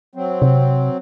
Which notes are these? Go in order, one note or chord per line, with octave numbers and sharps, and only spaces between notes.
F#3 C4
C3